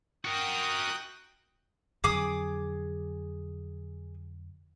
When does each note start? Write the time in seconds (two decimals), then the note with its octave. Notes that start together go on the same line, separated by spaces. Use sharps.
0.25 F#4 A#4 G5 D#6 F#6
2.04 F2 D3 F#3 G#4 D6 D#6